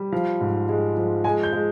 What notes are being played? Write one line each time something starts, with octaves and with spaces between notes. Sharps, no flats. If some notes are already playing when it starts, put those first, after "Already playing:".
Already playing: G3
F3 F5
G#2
G#3
F3
G#3 G#5
G6
G#3